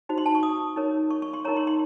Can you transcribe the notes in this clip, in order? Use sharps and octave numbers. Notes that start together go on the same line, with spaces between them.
D#4 F#4 C5
C6
A5
C#6
D#6
D#4 A#4 C#5
C#6
C#6
C6
D#4 A#4 C#5 A#5
C6
C6